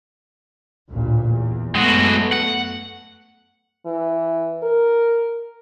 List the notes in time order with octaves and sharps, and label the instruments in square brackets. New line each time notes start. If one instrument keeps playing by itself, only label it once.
[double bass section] A1 D2 A#2
E2
[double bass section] F#2 A3 B3 [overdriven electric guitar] G#3 F#4
[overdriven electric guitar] F#5
[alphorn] E3
A#4